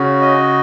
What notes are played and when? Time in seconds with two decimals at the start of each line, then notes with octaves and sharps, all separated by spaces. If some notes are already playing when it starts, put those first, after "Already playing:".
Already playing: C#3 C#4 F#4
0.21 D#5